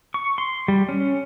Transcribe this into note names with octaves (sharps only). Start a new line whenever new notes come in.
C#6
C6
G3
C#4